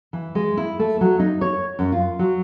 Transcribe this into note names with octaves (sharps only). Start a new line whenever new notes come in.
E3
G#3
E4
A3
F#3
D#4
C#5
F#2
F4
F#3